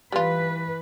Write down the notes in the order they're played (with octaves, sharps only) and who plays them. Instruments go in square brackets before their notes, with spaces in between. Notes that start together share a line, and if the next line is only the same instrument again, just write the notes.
[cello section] E3 B4 [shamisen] G3 F4